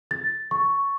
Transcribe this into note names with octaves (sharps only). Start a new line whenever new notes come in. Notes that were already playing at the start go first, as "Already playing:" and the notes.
A6
C#6